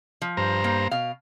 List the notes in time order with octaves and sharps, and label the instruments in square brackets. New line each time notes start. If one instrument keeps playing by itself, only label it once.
[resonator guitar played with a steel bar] F3
[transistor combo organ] G2 C5 A#5
[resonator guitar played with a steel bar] A#3
B2 F5